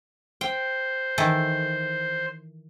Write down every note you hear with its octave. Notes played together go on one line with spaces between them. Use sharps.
C5 G5
D#3 E3 A4